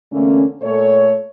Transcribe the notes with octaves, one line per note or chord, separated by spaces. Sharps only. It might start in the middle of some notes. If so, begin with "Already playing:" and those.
E2 D3 A3 A#3 C#4
A#2 A3 A4 C#5